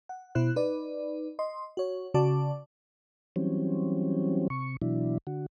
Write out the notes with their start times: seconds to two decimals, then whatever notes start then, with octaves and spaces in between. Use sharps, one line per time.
0.09 F#5
0.35 B2 E4 C5 F#6
0.56 D#4 B4 D5
1.39 D#5 C6
1.77 F#4 C#5
2.14 C#3 F#4 D5 A5 D6
3.36 E3 F#3 G3 C4 C#4
4.50 C3 C#6
4.82 B2 E3 F#3 D4 E4
5.27 D3 F#4